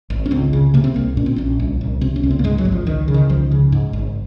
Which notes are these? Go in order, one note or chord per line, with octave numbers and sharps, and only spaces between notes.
G#1
C#4
C#2 C4
C#3
C3 A#3
C4
C2 A#3
A#2 C#4
C4
A#1 C#4
C2
C2
C3 C4
C#4
C#2
C4
A#3
G#2 G#3
F#3
G#1
F3
C#2 D#3
C#3
D#3
C#2 F3
C#3
G#2
G#1